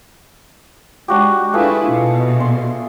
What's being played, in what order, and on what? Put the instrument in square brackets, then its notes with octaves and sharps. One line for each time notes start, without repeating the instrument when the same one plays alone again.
[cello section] G#3 [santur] D4 F#4 G4
[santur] A3 F4 G#4 [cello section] D4 E4 B4
[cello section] B2
[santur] C6